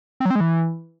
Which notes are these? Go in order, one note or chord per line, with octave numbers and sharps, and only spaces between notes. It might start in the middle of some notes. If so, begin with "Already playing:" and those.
C4
F#3
C4
G#3
E3